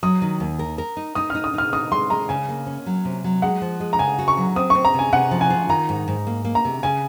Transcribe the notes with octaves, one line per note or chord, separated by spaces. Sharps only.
F#3 D#6
D#3
D#2
A#4
A#4
D#4
D#4 D#6
F6
D#4
D#6
D#4 F6
D#4 D#6
G#3 C6
G#3 A#5
C#3 G#5
A#3
C#4
F#3
C3
F#3
G#3 F#5
F3
G#3
A#5
C#3 G#5
F#4
C#6
F#3
C4 D#6
C#6
C4
A#5
C3 G#5
C3 F#5
F3
G#5
F4
D#3 A#5
G#2
G#2
A#3
A#3
A#5
C3
C#3 G#5